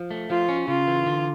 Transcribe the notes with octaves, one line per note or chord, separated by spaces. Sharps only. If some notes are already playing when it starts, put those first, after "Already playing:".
Already playing: F3
A3
F3 F4
C#4
C#3 F4
E3
D3